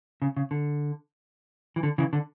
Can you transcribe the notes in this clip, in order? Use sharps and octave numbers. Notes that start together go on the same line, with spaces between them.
C#3
C#3
D3
E3
D3
C#3 E3
D3